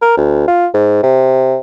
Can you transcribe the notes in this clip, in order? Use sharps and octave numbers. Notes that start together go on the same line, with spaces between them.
A#4
D2
F4
G#2
C3